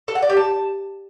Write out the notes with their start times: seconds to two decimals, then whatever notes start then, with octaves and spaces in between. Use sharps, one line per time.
0.08 A4
0.15 F#5
0.22 D5
0.30 G4
0.37 A5